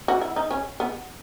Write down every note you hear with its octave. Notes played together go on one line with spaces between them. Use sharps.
F#4
E4
D#4
C#4
B3